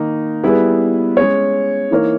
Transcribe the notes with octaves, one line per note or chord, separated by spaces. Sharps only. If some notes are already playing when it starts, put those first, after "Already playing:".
Already playing: D#3 A#3 D#4
G3 B3 E4 G#4 B4
G#3 C#4 G#4 C#5
E3 A#3 D#4 A#4 C#5